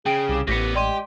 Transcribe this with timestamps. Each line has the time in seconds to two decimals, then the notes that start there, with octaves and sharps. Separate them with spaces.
0.06 C#3 G#4 G5 D7
0.28 C2 D6 E7
0.47 A1 A2 B3 G4 A#6 B6 C#7
0.76 G#3 G4 D5 C6 D#7